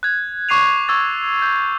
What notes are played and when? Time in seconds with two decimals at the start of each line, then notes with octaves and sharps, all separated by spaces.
0.03 F#6 G#6
0.49 C#6 D6 C7 D#7 F7
0.88 C#6 E6 G#6 A6
1.42 G6